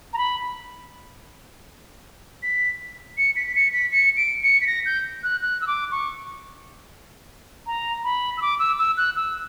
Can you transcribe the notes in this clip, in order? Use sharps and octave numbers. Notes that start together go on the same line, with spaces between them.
A#5
B5
B6
C#7
B6
B6
C#7
B6
C#7
D7
C#7
B6
A#6
G6
F#6
F#6
E6
D6
C#6
A#5
B5
E6
D6
E6
E6
F#6
E6